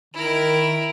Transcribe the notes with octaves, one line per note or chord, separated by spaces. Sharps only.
D#3 E4 A#4